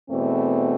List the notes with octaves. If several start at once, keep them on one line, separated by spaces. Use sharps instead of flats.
E2 B2 A3 C4